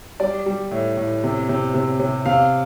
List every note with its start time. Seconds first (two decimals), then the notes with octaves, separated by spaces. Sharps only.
0.20 G3 D5
0.46 G3
0.71 A2
0.97 A2
1.24 C3
1.49 C3
1.74 C3
2.00 C3
2.26 C3 F5